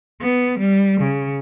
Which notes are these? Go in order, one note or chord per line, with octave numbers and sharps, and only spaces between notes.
B3
G3
C#3